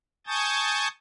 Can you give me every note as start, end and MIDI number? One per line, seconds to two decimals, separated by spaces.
0.27 0.88 80
0.27 0.88 81
0.27 0.88 85
0.27 0.88 87
0.27 0.88 91
0.27 0.88 93